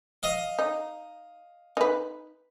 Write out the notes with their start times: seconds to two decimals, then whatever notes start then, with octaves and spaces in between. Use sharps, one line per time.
0.23 D#5 F5
0.59 D#4
1.77 D#4 B4